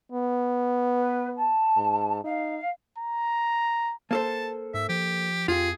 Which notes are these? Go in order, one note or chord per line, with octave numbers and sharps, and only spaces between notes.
B3
B4
A5
G#2
D#4 F5
A#5
A#3 A4 C5 A5
G#2 E5
F3 G4
F2 F4 G4 G#4